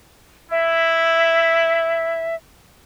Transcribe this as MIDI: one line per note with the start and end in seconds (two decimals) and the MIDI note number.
0.51 2.25 64
0.51 2.35 76